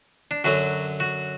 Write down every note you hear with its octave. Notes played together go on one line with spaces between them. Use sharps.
D4
F#2 D3 F#3 F#4
F#4